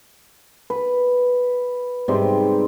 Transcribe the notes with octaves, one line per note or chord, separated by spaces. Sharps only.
B4
G#2 C3 G3 C4